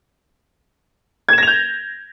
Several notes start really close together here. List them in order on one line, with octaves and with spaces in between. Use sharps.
G#6 E7 A#6 F7 G6